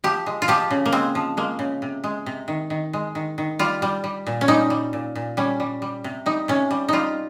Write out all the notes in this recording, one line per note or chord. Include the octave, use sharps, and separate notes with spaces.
F3 G4
G#3
F4
F3 G4
C#3
A#3
G#3 C4
F3
G#3 A#3
C#3
C3
G#3
C3
D#3
D#3
G#3
D#3
D#3
G3 F4
G3
G3
A#2
C#4
G3 D#4
G3
A#2
A#2
G3 C#4
G3
G3
C3
G3 D#4
C3 C#4
G3
G3 D#4 F4